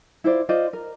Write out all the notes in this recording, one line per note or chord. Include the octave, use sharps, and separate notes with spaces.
E4 F4 C5 D5
F4 C5 D5 D#5
A#4